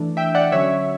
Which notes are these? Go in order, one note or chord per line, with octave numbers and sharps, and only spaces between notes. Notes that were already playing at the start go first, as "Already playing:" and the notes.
Already playing: E3 A3 D4
E5 G5
D5 F#5
D3 F#3 C#4 C#5 E5